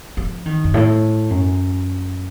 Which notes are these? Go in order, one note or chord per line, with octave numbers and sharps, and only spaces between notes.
F3
D#3
F#2
A2
F#2